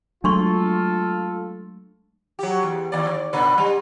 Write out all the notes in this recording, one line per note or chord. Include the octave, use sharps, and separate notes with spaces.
F#3 G#3 A3 D4 F4 A4 C6 C#6
F#3 G4
E2
D#2 D5
D#3
A#2 D3 B4
G3